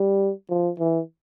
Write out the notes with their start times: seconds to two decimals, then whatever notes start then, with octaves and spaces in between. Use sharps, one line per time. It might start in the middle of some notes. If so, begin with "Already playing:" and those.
Already playing: G3
0.50 F3
0.79 E3